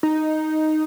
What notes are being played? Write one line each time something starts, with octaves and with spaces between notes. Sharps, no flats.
D#4